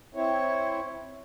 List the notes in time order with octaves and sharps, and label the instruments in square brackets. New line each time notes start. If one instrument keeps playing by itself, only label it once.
[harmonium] C4 E4 C#5